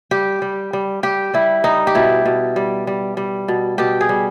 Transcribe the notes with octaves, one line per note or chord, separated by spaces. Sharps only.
G3 G4
G3
G3
G3 G4
G3 E4
G3 D#4
G4
B2 E4
B2
G3
G3
G3
B2
B2 G4
G#4
G3